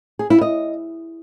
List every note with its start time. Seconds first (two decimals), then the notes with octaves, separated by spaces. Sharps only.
0.19 G#4
0.30 E4
0.41 D#5